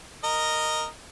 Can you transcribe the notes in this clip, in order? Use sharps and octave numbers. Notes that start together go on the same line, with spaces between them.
A#4 D#5